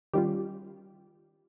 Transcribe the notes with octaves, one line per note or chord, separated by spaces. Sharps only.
D#3 G3 C#4 F4 G4